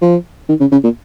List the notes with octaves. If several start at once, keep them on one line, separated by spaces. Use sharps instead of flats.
F3
D#3
C#3
C#3
A#2